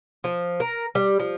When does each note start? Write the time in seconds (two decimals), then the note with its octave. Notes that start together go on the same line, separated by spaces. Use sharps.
0.24 F3
0.60 A#4
0.95 G3
1.20 F3